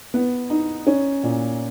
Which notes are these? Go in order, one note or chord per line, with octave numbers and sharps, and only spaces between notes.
B3
D#4
C#4
A#2